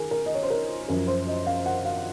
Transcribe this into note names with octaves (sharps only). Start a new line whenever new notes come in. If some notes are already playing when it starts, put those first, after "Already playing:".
Already playing: D#3 G#4 A#4
A#4
D#5
C#5
C5
A#4
F#2 F3 A#4
C5
D#5
F5
F#5
F5